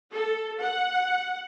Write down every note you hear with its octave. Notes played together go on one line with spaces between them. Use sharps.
A4
F#5